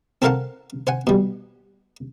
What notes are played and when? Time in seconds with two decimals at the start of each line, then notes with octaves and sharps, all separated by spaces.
0.22 C4 A4 A#4 F5 F#5 A5
0.87 C5 F#5 G#5
1.07 B2 G3